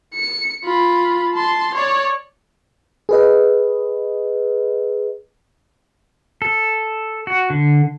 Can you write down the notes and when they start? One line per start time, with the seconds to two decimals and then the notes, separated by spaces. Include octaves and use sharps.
0.14 C#7
0.64 F4 B5
1.35 A5 C6
1.75 C#5 D5
3.09 G#4 B4 D#5
6.42 A4
7.27 F#4
7.50 D3